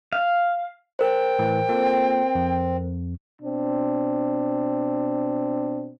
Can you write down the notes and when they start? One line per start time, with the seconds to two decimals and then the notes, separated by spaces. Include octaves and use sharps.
0.13 F5
0.99 A#4 C5 G5
1.39 A2 E3
1.69 A#3 C4 F4 A4
2.35 F2
3.42 B2 C4 D4